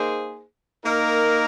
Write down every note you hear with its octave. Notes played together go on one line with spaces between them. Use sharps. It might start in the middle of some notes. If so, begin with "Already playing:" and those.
Already playing: A#3 D#4 G#4 C5
A#3 D#4 A#4